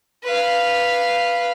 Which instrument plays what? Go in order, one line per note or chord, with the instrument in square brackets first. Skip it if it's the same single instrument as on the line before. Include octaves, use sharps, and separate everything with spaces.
[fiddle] B4 F5